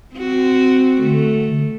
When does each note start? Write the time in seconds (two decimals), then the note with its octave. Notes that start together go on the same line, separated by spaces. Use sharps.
0.15 C4 F#4
1.01 D3 A3